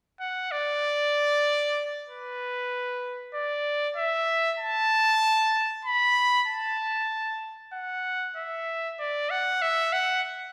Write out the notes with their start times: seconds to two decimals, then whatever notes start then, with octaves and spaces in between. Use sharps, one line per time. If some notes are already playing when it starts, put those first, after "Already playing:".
0.20 F#5
0.51 D5
2.09 B4
3.35 D5
3.96 E5
4.59 A5
5.85 B5
6.47 A5
7.73 F#5
8.37 E5
8.99 D5
9.30 F#5
9.62 E5
9.93 F#5